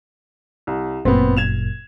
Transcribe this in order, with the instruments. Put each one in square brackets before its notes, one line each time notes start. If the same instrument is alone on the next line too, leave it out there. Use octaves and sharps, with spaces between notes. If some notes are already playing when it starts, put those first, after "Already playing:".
[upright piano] C2
[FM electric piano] G1 F#2 A#2 [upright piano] B3 C4
[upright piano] G#6 E7 F7